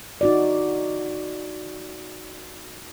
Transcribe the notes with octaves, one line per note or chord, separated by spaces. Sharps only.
D#4 F#4 D5